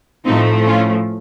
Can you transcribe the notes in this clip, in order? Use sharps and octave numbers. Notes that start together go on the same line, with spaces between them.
A2 F3 A3 C4 D#4
C#4 F4